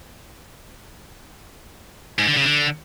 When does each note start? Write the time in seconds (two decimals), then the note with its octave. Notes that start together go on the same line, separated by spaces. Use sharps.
2.18 G#2
2.28 D3
2.37 C#3
2.46 D3